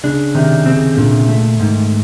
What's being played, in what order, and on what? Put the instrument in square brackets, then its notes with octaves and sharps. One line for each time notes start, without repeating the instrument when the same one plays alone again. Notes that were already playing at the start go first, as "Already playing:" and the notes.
[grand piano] C#3 [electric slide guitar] D4
[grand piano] C3 [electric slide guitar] D#3
[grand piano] C#3 [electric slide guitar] C4
[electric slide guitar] A#2 [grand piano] D3
[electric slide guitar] A3
[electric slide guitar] G#2 [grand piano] D#3